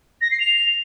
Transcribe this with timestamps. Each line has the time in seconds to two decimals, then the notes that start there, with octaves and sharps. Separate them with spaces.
0.21 A#6
0.31 C7
0.40 F7